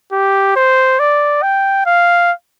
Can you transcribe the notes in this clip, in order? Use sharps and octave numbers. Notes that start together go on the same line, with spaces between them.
G4
C5
D5
G5
F5